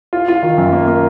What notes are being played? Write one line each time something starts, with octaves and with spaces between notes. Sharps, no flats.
F4
F4
D#3
F#2
A#3
A#3